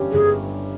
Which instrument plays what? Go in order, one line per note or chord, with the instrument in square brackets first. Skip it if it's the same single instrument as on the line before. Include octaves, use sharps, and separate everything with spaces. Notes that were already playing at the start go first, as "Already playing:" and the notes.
Already playing: [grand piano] G1 G2 G3 C#4 G4
[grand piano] G1 [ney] G#4